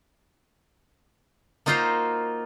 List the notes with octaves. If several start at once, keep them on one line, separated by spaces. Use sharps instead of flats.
A#3 D#4 F4 F#4 C5 A#5